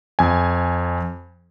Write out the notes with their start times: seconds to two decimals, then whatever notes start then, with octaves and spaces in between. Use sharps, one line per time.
0.19 F2 G#5